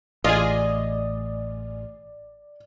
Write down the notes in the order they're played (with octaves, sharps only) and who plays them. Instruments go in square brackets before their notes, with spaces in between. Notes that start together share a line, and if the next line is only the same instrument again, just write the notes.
[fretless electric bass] A1 [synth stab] F4 G#4 [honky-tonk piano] D5 [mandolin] D#5